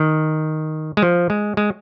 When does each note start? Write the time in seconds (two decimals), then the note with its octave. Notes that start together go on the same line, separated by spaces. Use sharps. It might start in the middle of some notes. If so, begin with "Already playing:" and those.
Already playing: D#3
0.97 G#3
1.02 F3
1.30 G#3
1.57 G#3